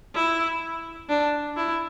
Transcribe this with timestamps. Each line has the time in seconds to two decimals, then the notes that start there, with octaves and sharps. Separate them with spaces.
0.15 E4
1.09 D4
1.57 E4